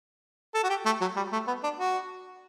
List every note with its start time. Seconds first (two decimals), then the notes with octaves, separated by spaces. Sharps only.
0.55 A4
0.64 F#4
0.70 G4
0.86 A3
1.01 F#3
1.16 G3
1.33 A3
1.47 B3
1.63 D4
1.79 F#4